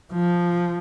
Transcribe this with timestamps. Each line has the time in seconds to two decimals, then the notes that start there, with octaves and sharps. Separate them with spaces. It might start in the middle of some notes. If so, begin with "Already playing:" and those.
0.13 F3